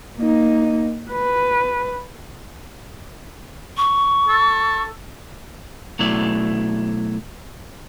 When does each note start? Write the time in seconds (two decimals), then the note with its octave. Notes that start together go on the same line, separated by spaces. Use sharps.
0.18 A#3 D#4
1.10 B4
3.77 C#6
4.28 A4
5.99 B2 F#3 A3 E4 D5